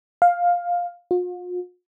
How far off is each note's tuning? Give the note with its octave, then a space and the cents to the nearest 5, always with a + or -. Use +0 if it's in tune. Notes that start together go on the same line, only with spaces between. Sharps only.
F5 +10
F4 +45